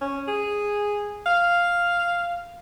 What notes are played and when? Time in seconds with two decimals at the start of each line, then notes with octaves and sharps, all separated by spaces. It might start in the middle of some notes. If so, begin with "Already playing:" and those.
0.01 C#4
0.28 G#4
1.26 F5